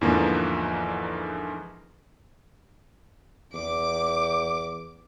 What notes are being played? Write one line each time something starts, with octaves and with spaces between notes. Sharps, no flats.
E2 G#2 D3 E3 F3 A#3
E2 D6